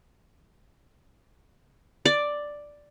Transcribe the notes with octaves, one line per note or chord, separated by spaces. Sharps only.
D5